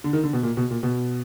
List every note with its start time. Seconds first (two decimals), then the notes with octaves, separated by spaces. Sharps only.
0.04 D3
0.13 D#3
0.24 D3
0.33 B2
0.43 A#2
0.57 B2
0.71 A#2
0.83 B2